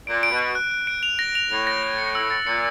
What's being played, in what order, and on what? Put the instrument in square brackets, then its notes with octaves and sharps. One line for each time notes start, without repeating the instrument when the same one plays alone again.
[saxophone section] A#2 [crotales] D7
[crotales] D7
[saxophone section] B2
[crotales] D7
F#6
F#6
D7
F7
A#6
F7
[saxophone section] A2 [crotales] F7
[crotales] A#6
F7
C#7
E6
A6
[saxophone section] A#2 [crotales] C#7